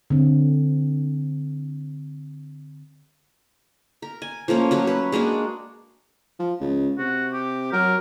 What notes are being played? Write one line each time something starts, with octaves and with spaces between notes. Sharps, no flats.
D3 C4
A#4
G#5
F3 A3 A#3 C#4
F#3 C#4 F#4
B4
G#3 A#3 D4 F#4
F3
C#2
C3 F#4
G4
F#3 A#4